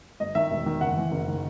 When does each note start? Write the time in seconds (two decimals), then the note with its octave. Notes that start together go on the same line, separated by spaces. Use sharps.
0.20 G1 D#5
0.35 D#3 E5
0.50 E1
0.66 D#3
0.81 F#1 F#5
0.97 E3
1.12 F#1
1.28 D#3